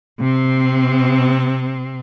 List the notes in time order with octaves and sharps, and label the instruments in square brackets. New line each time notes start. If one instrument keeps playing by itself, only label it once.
[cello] C3 C4